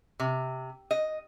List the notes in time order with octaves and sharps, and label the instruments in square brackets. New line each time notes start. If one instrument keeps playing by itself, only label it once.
[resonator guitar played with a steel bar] C3
D#5